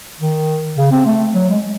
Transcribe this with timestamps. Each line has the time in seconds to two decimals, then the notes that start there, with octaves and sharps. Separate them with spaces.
0.20 D#3
0.77 C#3
0.92 C4
1.06 A3
1.35 F#3
1.50 G#3